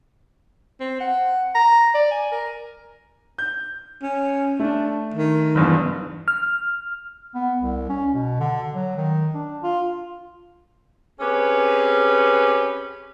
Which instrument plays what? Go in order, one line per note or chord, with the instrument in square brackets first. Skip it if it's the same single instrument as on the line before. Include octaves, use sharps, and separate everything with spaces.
[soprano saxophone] C4
F#5
A#5
D5
G#5
A#4
[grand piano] G6
[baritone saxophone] C#4
[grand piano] A3 [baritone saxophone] D4
[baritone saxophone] D#3
[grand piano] F#1 E2 G2
[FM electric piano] F6
[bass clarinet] B3
C2
C#4
B2
D3
F#3
D#3
D4
F4
[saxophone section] C4 C#4 G4 G#4 B4